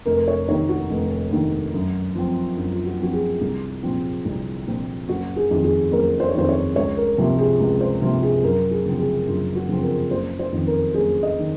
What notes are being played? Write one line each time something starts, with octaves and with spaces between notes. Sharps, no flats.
F1 A#4
C#5
D#2 D#3 C#5
F#4
F1
D#2 D#3
F#2
F3 C4
F#2
F4
F#4
F3 C4 F#4
G#4
C2
A#2 F3 C4
C2
A#2 F3 C4
F#1 F#4
G#4
F2 D#3
G#4
F#1 A#4
C5
C#5
F2 D#3 C5
C#5
C#2 C#5
A#4
C3 F3 A#3
G#4
C#2
C5
C3 F3 A#3 F4
G#4
F#2 A#4
G#4
C#3 F3 C4
G#4
F#2 F4
F#4
C#3 F3 C4
A#4
F#1 C5
C5
F2 D#3
A#4
F#1 G#4
D#5
D#3